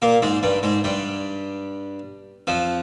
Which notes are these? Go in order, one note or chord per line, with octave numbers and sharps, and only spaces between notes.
A#2 A#3
G#2 G#3
G2 G3
G#2 G#3
G2 G3
F2 F3